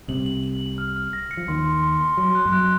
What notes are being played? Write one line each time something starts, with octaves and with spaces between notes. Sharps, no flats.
C2 C3 F#7
F#7
F#7
F#7
F6
F6
A#6
C#7
F3
D#2 D#3 C6
C6
C6
C6
F#3 C6
F#6
F#2 F#3
F#6